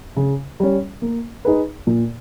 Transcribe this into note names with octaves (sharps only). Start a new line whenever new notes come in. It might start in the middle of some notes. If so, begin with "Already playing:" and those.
C#3
G3 C#4
A#3
D#4 G#4 B4
A#2